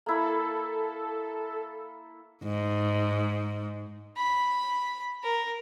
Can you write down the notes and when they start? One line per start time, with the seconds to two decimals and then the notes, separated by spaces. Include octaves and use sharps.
0.06 A#3 E4 A4 B5
2.44 G#2
4.16 B5
5.23 A#4